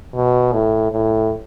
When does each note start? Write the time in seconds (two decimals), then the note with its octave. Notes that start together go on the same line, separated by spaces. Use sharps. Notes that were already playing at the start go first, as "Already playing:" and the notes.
0.15 B2
0.53 A2
0.92 A2